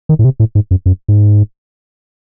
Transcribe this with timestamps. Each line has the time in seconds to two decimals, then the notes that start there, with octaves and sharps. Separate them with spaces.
0.09 D#3
0.19 A2
0.25 C3
0.40 A2
0.55 G#2
0.71 F#2
0.86 F#2
1.08 G#2